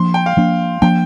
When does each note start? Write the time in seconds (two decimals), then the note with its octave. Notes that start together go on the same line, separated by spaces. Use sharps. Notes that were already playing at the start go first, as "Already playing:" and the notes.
Already playing: F3 A#3 D4 C6
0.14 G5
0.26 F5
0.37 F3 A#3 D4
0.82 F3 A#3 D4 G5